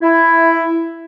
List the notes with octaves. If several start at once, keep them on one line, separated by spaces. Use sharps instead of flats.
E4